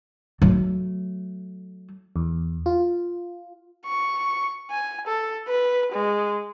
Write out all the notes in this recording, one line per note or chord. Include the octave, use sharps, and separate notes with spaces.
F#3 A3
E2
F4
C#6
G#5
A4
B4
G#3